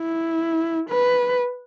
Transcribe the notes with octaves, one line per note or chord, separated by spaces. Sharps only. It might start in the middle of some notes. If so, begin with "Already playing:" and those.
Already playing: E4
B4